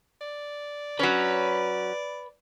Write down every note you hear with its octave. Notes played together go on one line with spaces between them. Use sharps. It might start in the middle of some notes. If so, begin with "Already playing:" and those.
D5
F#3 C#4 B4